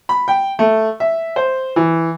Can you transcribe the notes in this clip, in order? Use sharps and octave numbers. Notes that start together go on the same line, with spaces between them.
B5
G5
A3
E5
C5
E3